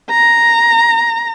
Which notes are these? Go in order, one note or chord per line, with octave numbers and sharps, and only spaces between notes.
A#5